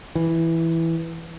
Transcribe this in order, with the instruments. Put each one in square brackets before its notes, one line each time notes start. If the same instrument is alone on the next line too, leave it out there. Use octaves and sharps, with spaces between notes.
[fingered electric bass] E3